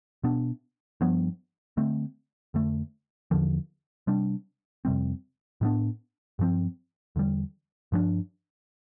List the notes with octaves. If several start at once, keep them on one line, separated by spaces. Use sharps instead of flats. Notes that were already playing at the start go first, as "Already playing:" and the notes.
B2 B3 D4
G2 F3 B3
D3 A3 C4
F2 D3 A3
E2 D3 F3
C3 G3 D4
F2 C3 G3 C4
A2 G3 B3 D4
G2 F3 C4
E2 D3 G3
G2 F3 B3 D4